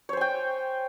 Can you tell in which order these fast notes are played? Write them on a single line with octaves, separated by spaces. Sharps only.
C#5 C5 G#5 G5